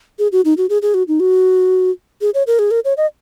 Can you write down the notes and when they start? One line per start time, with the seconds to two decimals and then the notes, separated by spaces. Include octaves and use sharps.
0.19 G#4
0.32 F#4
0.45 D#4
0.57 F#4
0.70 G#4
0.82 G#4
0.94 F#4
1.08 D#4
1.20 F#4
2.21 G#4
2.34 C#5
2.47 A#4
2.59 G#4
2.71 A#4
2.85 C#5
2.97 D#5